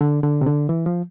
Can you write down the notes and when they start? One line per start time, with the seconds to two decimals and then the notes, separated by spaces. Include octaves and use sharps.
0.01 D3
0.23 D3
0.41 C3
0.46 D3
0.69 E3
0.86 F3